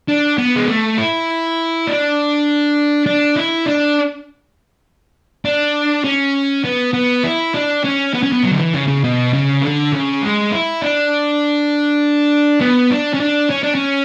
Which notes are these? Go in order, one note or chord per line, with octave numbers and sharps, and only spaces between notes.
D4
B3
G#3
A3
E4
D4
D4
E4
D4
D4
C#4
B3
B3
E4
D4
C#4
B3
C#4
B3
F#3
D3
E3
C#3
C#3
B2
C#3
D3
C#3
G#3
E4
D4
B3
D4
C#4
D4
C#4
D4
C#4